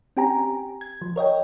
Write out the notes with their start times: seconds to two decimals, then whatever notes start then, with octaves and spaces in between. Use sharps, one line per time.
0.17 C4 C#4 G4 G5 G#5 A#5
0.81 G#6
1.02 F3
1.16 A#4 C#5 D#5 G5